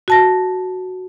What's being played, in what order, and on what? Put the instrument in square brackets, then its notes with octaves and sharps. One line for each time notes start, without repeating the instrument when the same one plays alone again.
[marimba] F#4 A5 A#6